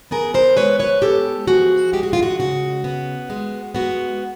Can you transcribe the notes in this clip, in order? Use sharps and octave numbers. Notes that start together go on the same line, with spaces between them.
B3 G#4 A#4
A#4 C5
G#3 B4 C#5
B4 C#5
B3 G4 A4
F3 F#4 G#4
G#3 G4
F#4
F4
F#4
C#3 F#4
B3
G#3
B3 F#4